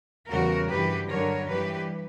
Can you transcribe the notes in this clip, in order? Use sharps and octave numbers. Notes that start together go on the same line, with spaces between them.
E2 C#3 E3 G3 F#4 A#4
G2 E3 G3 G4 B4
G2 D3 F#3 A#4 C#5
G2 E3 G3 G4 B4